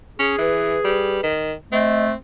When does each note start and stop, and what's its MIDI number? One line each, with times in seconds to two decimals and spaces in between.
0.19 0.36 61
0.19 1.26 68
0.39 0.76 52
0.39 1.25 71
0.84 1.19 55
1.23 1.53 51
1.72 2.12 57
1.72 2.15 60
1.72 2.05 75